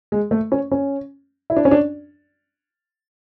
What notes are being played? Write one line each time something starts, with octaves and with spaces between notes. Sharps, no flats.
G#3
A3
C#4
C#4
E4
D4
C#4
D4